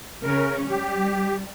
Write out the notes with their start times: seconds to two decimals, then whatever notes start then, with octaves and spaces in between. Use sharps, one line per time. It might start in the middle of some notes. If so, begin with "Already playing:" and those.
0.23 C#3 C#4 A#4
0.69 G3 G4